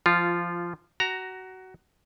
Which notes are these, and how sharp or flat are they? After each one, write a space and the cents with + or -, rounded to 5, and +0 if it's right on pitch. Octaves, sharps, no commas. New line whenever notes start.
F3 -15 F4 +0
F#4 +20 A#5 +0